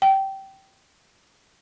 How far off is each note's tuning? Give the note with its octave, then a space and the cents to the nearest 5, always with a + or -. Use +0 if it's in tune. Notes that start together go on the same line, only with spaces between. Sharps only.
G5 -15